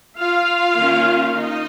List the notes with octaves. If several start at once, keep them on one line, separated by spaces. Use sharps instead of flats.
F4 F5
D#3 A#3 C#4
D#4 D#5